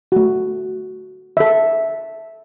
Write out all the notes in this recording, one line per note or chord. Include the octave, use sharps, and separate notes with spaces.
A3 F#4
A4 E5